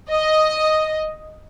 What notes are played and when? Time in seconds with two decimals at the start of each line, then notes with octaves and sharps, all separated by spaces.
0.10 D#5